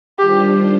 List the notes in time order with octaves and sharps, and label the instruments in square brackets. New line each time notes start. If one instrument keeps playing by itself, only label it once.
[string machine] D#3 G3 D4 F4 C5 [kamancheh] G4